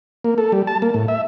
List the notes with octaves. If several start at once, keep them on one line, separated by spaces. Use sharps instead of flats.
A#3
A4
G3
A5
A#3
A2
E5